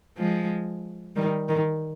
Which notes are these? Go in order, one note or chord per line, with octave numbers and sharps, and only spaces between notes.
F3 G#3
D#3 G3
D#3